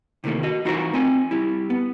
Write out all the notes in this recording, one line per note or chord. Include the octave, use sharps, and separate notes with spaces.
C3 D#3 E3 A3 A#3
F#4 D#5
E3 D#4 F4 F#4 A#4 C5
A3 C4 D#5 G#5
G3 E4
B3